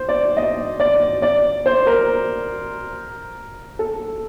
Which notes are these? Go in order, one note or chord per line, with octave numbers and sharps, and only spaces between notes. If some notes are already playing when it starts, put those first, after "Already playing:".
Already playing: C5
D5
D#5
D5
D5
C5
A#4
A4